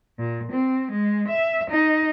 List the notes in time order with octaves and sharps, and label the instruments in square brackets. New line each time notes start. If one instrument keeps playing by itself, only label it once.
[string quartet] A#2
C4
G#3
E5
D#4